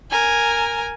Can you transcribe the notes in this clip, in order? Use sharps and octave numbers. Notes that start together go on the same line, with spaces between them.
A#4 G#5